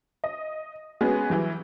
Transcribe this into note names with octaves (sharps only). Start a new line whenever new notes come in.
D#5
G#3 B3 C#4 F#4 G#4
E3 F#3 G3